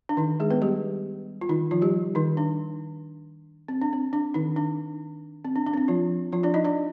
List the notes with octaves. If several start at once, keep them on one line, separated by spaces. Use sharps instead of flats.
D4
D#3 D#4
G#3 G#4
B3 B4
G3 G4
F4
D#3 D#4
F3 F4
G3 G4
D#3 D#4
D4
C4
D4
C4
D4
D#3 D#4
D4
C4
D4
D4
C4
D4
F3 F4
F3 F4
D4 D5
D#4 D#5
D4 D5